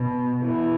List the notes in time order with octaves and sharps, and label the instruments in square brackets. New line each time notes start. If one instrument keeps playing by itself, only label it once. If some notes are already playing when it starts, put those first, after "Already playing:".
Already playing: [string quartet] B2
B2 E3